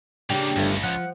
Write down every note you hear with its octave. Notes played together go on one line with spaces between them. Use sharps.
C#3 G3 A#3 D4 G4
G1 C#2 G2 A3
F3 F#5